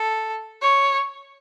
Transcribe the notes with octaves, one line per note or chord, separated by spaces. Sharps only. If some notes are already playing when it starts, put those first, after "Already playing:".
Already playing: A4
C#5